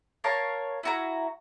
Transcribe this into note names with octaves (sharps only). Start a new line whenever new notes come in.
A#4 C#5 F5 A5
E4 F#4 A#5